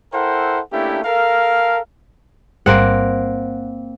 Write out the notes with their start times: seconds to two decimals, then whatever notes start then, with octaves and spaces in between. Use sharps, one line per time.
0.13 E4 A4 A#4 C5 F#5 G5
0.72 A3 A#3 C#4 D4 E4 G4
1.05 A4 A#4 F5
2.66 A1 G#2 G3 A#3 C4 F#5